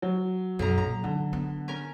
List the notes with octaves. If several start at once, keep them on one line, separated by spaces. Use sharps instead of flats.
F#3
B1 F#2 A#5
A#2 A#5
D3 E3
B3
C#4 A#4